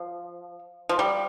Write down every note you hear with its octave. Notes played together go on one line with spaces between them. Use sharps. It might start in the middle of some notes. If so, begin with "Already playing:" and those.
Already playing: F3
F3
G3